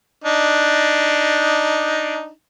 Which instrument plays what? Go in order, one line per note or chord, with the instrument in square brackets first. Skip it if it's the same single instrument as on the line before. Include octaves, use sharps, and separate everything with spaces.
[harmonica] D4 D#4